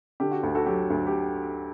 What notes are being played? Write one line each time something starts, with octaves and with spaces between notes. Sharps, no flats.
D3 G4
F#4
D2
F#4 A4
F#3 G4
D2
G4